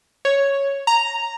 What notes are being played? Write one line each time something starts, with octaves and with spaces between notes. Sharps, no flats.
C#5
A#5